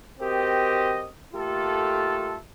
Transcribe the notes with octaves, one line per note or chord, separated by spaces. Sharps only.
C4 F#4 G4 A#4 D#5
A3 A#3 F4 G4 A4